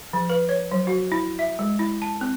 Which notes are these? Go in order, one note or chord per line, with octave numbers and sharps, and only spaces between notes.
F3
B4
C#5
F#3
F#4
E4
E5
G#3
E4
A5
C4